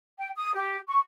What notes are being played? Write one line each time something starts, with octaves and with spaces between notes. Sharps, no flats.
G5
D#6
G4
C#6